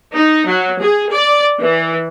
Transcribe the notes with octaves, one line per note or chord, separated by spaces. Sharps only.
D#4
F#3
G#4
D5
E3